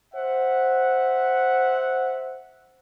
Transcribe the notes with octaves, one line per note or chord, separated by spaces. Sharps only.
C5 E5 F#5